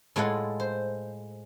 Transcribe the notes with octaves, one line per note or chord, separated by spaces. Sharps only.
A2 G#3 F4 A4 F#5
C5